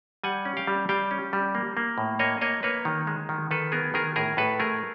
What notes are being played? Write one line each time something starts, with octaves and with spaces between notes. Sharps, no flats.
G3 F#5 G#5
C#4
F5 G5
G3
G3 F5 G5
C#4
G3
A#3
A#3
A2
A#3 C#5 D#5
A#3 C#5 D#5
A#3 B4 C#5
D#3
G#3
D#3
D#3 A4 B4
B3 G#4 A#4
D#3 G#4 A#4
A2 G#4 A#4
A2 A4 B4
A3 G#4 A#4